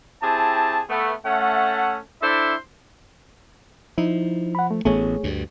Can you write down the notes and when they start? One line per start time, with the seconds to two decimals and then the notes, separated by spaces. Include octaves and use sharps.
0.22 C4 E4 G4 G#4 A5
0.90 A3 B3
1.25 A3 C#4 F#5
2.22 D4 E4 A4 C5 D5 E5
3.98 F3 D#4 E4
4.55 F#5 B5
4.71 A3
4.85 A1 A3 B3 G#4 C#5
5.23 D2 G2